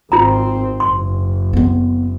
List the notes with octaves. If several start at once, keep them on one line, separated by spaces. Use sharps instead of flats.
G#1 C4 F4 A#5
F#1 C6
B3 C4